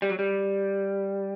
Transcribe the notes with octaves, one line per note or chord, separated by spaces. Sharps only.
G3
F#3
G3